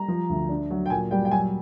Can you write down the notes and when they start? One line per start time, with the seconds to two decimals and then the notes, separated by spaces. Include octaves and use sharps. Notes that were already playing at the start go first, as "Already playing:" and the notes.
Already playing: G3 A#5
0.08 F3
0.30 D2
0.49 D4
0.71 F#3
0.86 G5
0.90 A#2 G#5
1.11 G3 G5
1.25 G5
1.31 F#3 G#5